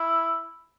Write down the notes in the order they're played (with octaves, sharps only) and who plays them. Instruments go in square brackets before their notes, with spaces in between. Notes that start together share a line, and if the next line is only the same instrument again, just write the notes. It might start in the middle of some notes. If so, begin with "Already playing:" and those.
Already playing: [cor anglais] E4